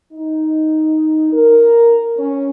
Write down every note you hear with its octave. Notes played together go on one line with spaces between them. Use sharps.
D#4
A#4
C#4